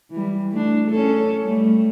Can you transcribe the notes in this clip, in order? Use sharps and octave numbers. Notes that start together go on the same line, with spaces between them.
E3 G3
A3 D4
C#4 A4
G3 A3